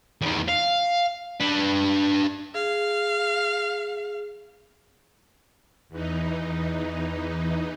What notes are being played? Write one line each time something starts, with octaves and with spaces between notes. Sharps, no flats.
E2 D#3
F5
D4 B4
G#4 F5
E2 E3 D#4